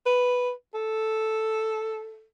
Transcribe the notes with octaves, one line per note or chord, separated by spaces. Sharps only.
B4
A4